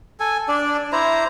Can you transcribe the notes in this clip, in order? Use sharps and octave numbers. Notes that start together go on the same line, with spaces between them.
A4 G#5
D4 D5
E4 C5 A#5